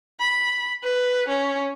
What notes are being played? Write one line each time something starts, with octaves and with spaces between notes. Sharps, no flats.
B5
B4
C#4